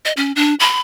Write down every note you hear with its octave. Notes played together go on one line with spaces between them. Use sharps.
D#5
C#4
D4
B5